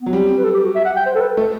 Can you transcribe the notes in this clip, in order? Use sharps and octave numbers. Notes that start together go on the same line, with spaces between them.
F#3 B3
G3 C4
C4
B4
A4
G4
F#4
E5
F#5
G5
C5
A4
B4
A3 A4